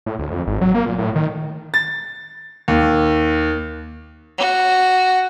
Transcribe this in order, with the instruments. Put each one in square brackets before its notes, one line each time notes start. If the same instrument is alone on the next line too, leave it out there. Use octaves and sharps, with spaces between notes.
[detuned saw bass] A2
D2
F2
G#1
F#3
A#3
A#2
A2
D#3
[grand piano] A6
D#2
[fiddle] F#4